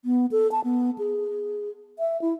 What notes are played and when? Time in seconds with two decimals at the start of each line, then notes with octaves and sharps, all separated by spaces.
0.05 B3
0.31 A4
0.52 A5
0.64 B3
0.98 G#4
1.99 E5
2.22 E4